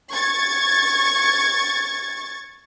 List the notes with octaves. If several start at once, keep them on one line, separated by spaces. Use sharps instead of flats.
C#6 G#6 A6